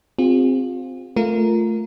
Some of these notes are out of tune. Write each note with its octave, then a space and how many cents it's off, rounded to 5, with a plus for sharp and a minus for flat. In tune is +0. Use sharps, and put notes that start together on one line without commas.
C4 +0 F4 +25 G#4 -45
A3 +0 F4 +0 A#4 +0